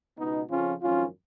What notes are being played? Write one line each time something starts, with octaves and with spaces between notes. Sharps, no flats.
C#2 B2 B3 D#4
F2 C#3 F3 C#4 F4
G#1 F#2 F3 C#4 F4